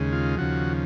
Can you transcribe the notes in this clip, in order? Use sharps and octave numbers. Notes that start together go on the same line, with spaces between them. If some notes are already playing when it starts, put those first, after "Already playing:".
Already playing: D#2 C#3 G#3
F4
D#2 C#3 F3 F#4